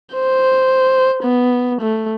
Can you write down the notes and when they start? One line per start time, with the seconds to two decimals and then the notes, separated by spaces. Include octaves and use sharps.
0.14 C5
1.23 B3
1.81 A3